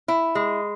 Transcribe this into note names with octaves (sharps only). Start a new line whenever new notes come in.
E4
G#3